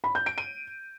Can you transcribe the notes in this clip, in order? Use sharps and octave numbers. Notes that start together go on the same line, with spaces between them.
B5
G6
D7
D#7